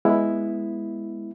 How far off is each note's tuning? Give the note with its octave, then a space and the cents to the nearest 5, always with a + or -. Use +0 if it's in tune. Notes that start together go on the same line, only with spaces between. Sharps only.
G#3 +0 B3 -5 E4 +0